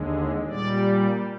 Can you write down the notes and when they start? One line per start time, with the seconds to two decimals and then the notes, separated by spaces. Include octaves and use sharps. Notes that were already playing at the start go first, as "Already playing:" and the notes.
Already playing: D#2 D3 G#3
0.47 A#2 G3 D5